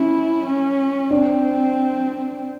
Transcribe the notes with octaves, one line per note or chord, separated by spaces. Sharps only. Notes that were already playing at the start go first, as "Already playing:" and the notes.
Already playing: C#4 E4
C#4
C4 D4